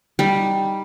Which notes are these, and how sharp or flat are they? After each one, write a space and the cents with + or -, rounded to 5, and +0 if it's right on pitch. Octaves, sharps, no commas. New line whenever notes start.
G3 +0 D#4 +0